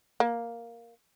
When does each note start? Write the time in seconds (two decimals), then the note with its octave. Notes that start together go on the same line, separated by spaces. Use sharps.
0.20 A#3